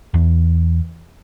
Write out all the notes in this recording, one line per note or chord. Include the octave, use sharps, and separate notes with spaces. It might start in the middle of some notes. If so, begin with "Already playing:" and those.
E2